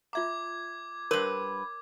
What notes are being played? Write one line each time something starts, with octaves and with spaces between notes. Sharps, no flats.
F4 E5 A#5 D6 G#6
G2 A#4 B4 C#5 C6